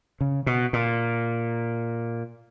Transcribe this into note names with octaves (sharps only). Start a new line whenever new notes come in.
C#3
B2
A#2